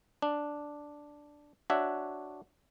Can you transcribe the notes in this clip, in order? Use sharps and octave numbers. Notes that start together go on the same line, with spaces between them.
D4
D4 F#4 C#5 E5